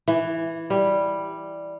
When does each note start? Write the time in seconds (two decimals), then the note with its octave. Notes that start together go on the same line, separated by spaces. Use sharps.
0.08 E3
0.70 G3